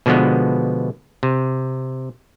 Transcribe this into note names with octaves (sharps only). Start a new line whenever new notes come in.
B2 D3 F3 G#3 B3
C3